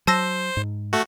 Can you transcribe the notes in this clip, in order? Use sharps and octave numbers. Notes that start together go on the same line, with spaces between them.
F#3 C5 A5 E6 A#6
G#2
A3 F#4